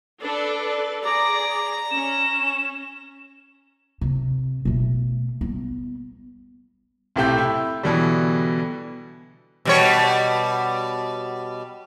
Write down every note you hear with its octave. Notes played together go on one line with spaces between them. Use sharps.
D4 A4 B4 D5
G#4 D5 A#5 D6
C#4 E7
C3
B2 A3
G3 B3
B1 A2 C3 A3 G4 G6
E4
B2 D3 E3 F#3 G3
B2 G3 C#5